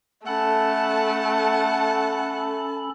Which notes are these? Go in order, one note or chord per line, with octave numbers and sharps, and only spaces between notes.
A3 C#4 A4 F#5 A5 B5